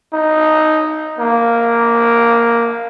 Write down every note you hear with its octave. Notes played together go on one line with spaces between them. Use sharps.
D#4
A#3